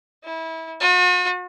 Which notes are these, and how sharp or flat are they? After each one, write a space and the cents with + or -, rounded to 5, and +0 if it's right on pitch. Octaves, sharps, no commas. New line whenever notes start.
E4 -25
F#4 -45